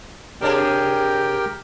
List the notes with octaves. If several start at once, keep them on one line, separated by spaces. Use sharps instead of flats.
C3 D4 G4 G#4 A#4 G5